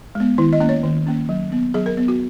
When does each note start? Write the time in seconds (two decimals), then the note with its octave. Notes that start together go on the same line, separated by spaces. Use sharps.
0.15 G#3 B3
0.38 D#3 E4
0.53 D#5
0.60 A#3 C#4
0.69 C#5
0.83 D#3
1.07 A#3 C#4
1.29 F#3
1.52 B3
1.74 F#3 G#4
1.86 A#4
1.97 B3
2.08 F#4